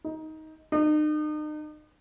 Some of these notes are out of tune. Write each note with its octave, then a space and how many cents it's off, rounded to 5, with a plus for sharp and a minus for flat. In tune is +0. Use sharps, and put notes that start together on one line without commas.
D#4 +15
D#4 -40